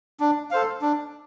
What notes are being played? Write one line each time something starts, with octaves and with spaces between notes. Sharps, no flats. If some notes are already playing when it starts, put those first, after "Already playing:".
D4
A4 C5 F5
D4